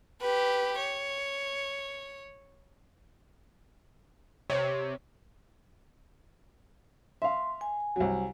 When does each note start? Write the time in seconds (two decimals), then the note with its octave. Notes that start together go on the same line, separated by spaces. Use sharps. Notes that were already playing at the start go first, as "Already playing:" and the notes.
0.21 G4 B4
0.79 C#5
4.50 C3 C#5
7.22 E5 F5 C6
7.61 G#5
7.96 C2 F#3